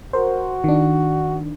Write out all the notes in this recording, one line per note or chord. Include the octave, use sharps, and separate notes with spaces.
F#4 A#4 C5
D#3 D4